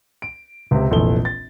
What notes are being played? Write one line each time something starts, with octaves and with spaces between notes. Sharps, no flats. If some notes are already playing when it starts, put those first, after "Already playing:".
D7
C#2 C3
F1 A#1 E3 A4 G7
A6